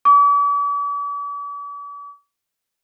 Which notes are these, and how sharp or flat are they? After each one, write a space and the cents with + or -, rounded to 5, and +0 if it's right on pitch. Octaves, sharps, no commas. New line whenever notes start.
D6 -45